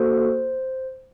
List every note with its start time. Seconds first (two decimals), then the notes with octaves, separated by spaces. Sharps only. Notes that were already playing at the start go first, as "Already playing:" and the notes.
Already playing: A#3 F#4 A4 C5